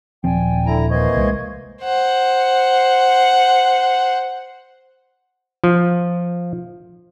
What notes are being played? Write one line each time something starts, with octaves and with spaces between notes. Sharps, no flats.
D#1 F3 C4 D5 G5 G#5
D3 E4 A#5
E3 A#3 C5 D#5 C#6 G#6
C2 G3 G#3
C5 F#5
F3